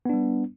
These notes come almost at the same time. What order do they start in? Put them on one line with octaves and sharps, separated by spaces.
B3 D4 G3